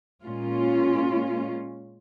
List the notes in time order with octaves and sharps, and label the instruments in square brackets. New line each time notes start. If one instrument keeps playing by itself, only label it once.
[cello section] A#2 G#3 C#4 F4